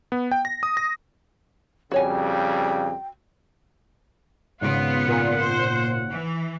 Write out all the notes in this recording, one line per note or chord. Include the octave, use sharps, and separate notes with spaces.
B3
G5
A#6
D#6
A#6
F2 C#3 G3 F#4 C#5 G5 G#5
G#1 C#3 B3 F4 F#5 D7
A#2
C5
E3